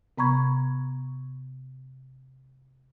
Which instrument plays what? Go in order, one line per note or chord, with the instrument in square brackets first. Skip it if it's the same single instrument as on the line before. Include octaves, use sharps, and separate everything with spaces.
[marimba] C3 B3 A#5 B5 C#6 G#6